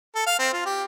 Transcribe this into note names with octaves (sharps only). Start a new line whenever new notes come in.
A4
F5
C4
F4
G4